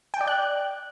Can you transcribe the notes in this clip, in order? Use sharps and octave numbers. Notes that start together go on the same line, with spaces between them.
G5
D5
F#6